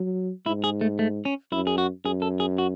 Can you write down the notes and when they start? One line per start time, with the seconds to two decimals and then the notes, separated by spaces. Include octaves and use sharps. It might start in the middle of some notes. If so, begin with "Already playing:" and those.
Already playing: F#3
0.46 G#2 E4
0.64 G#4
0.81 A3
0.99 A3
1.25 C#4
1.52 F#2 E4
1.67 G#4
1.78 F#4
2.05 F#2 G#4
2.22 A4
2.40 G#4
2.58 F#4